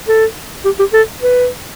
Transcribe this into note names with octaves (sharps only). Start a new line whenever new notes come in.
A4
G4
G4
A4
B4